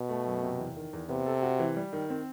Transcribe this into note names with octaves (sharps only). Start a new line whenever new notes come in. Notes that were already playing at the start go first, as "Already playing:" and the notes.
Already playing: B2
A3
F#2
C3
E2
D#3
E2
C3 B3
A4
F#4
E3
G3
D#3
C4